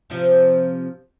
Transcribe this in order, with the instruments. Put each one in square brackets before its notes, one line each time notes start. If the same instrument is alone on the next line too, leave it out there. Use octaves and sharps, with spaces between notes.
[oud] C3 F3